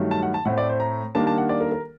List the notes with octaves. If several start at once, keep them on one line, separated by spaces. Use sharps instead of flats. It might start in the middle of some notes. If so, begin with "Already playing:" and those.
Already playing: G2 D#3 F#3 A3
A5
F#5
A5
A2 A3 C4 F#5
D5
C5
A#5
D#3 G3 A#3 D4 A5
A5
F#5
D5
A#4
A#4